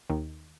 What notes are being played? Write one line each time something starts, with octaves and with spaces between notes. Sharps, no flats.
D#2 D#3